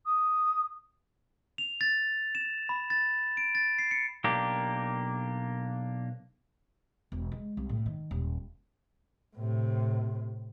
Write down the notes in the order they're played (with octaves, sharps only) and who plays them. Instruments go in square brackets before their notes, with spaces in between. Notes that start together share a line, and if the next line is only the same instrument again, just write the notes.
[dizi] D#6
[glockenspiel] F7
A6
E7
B5
A6
D7
A6
C7
C#7
[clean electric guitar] B1 A#3 D4 G4
[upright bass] E1
G#3
C2
A2
D#3
D#1
[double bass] A2 C3